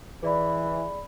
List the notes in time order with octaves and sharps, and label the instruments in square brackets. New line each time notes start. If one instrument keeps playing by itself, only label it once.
[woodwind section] E3 [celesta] G#4 D5 B5